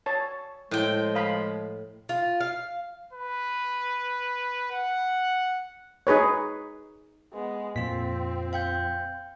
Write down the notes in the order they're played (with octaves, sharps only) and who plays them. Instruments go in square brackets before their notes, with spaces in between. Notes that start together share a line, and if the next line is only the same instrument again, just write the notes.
[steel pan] C#5 A5
[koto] A2 G5 [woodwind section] F3 G#3
[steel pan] D#5 F5 B5
[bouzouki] F4
F5
[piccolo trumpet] B4
F#5
[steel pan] D#4 G#4 B4 C#5
[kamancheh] G#3 B3
[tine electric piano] F2 F4 B6 [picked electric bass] A#2 [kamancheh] C4
[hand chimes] F5 G5 G6